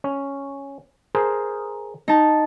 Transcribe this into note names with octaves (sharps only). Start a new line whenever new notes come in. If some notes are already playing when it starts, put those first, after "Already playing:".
C#4
G#4 A#4 C5
D#4 A5